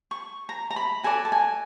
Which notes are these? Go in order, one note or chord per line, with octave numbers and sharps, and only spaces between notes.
C#6
A#5
A#5
B5
F#4 A4 D5 G#5
A5
G#5